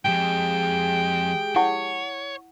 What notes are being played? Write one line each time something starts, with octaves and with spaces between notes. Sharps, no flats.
F2 G#2 G#3 G4 G#4 G5
E4 C#5 F#5 C#6